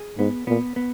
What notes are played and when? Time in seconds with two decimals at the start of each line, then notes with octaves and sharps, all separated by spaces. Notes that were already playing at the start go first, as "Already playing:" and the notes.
Already playing: G#4
0.18 G#2 B3
0.47 A#2 B3
0.76 B3